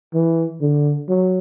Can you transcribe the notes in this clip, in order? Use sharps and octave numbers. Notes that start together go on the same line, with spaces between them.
E3
D3
F#3